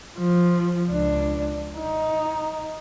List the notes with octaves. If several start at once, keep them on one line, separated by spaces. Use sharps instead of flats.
F3
C#2 D4
D#4